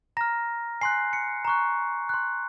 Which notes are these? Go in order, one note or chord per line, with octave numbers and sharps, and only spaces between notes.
A#5 F6 A#6
G#5 C6 F#6 C7
C#7
A#5 C#6 F#6
C6 F#6